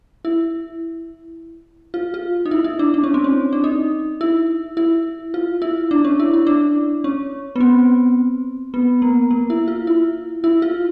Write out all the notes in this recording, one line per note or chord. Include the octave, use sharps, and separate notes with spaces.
E4
F4
F4
D#4
E4
E4
D4
D4
C#4
C4
C#4
D4
D#4
E4
E4
F4
E4
D4
C#4
E4
E4
D4
C#4
B3
C4
B3
A#3
A#3
E4
F4
E4
E4
F4